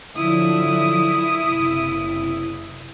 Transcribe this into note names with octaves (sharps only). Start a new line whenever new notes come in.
D3 F3 F#3 E4 D#6
F#1 C3